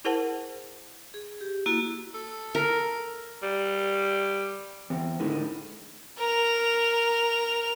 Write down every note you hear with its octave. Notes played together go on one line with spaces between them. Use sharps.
E4 G#4 A#4 C5 F#5 A5
G#4
G4
A#3 E4 F#4
A4
A#4
G3
E2 C4
A2 D3 D#3 G#3
A#4 F7